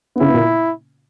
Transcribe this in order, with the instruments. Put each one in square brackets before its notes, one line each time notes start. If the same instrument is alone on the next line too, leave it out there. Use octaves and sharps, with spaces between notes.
[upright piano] B3
[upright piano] C#3 C#4 [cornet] E4
[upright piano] B3
A#2 A#3